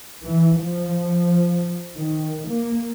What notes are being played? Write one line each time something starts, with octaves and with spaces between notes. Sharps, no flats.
E3
F3
D#3
A#3